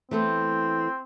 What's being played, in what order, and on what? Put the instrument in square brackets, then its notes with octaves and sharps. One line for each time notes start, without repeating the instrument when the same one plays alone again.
[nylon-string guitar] E3 A3 B3 [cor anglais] C4